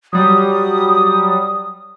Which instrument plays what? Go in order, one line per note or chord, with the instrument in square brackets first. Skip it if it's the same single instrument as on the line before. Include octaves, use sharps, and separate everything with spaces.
[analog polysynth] F#3 G3 [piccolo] D#6